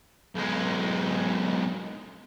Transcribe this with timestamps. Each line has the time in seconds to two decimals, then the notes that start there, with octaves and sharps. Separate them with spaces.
0.35 B1 G#3